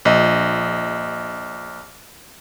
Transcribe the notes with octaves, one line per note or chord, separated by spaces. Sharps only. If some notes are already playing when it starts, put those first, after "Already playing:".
A#1 D#5